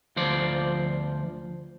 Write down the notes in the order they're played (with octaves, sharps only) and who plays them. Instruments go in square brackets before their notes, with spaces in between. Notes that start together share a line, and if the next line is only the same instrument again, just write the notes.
[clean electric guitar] D2 F3 C5 D5